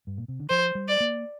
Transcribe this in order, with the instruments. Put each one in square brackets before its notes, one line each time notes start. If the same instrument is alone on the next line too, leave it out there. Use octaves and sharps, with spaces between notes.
[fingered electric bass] G2
A#2
C3
D3
[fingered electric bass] F3 [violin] C5
[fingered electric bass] G3
[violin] D5
[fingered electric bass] A#3